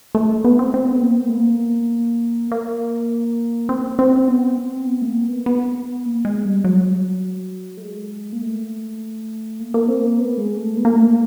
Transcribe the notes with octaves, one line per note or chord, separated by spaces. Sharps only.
A3
B3
C4
C4
B3
A#3
B3
A3
A#3
A#3
C4
C4
B3
C4
B3
A3
A#3
B3
B3
A#3
G#3
G3
F#3
A3
G#3
A#3
A3
A#3
A#3
C4
A#3
B3
G#3
A3
B3
A#3
A3
A#3